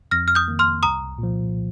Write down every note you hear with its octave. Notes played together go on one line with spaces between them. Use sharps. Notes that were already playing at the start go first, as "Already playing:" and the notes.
F2 F6 A#6
F6
D#6 G6
D#3 A#3
C6 F6
C2 A#5 D#6
A#2 F3